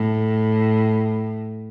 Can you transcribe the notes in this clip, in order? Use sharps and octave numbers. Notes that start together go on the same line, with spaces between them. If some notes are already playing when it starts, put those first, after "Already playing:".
Already playing: A2